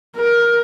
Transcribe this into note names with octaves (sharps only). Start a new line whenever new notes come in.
A#4